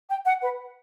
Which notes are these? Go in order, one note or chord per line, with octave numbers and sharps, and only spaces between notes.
G5
F#5
B4